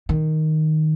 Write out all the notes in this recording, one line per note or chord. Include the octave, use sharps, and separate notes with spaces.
D#3